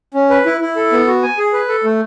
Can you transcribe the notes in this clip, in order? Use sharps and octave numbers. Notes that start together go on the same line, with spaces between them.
C#4
B4
E4
E4
A4
B3
F#4
G#5
G#4
B4
A4
A3